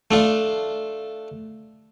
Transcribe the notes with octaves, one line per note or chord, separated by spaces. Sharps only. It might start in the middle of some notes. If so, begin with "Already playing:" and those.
A3 D4 F4